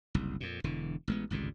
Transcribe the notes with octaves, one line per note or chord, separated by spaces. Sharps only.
F#1 C2
F2 A#2
E1 D3 E3
A1 G#3 B3
G#1 C#2 G2 D3